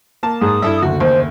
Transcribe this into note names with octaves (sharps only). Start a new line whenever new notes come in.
A#3 A5
G#2 G#4 D#6
G2 E4 A4 E5
F#1 D2 F#4
D#2 C5